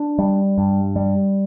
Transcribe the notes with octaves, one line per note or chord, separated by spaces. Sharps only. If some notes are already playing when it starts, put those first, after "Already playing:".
Already playing: D4
G3
G2
G3